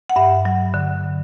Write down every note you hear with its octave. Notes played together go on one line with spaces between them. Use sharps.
F#5
G2 E5
F#3
D3